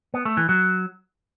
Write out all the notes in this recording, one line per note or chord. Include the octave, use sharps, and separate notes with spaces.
B3
A3
E3
F#3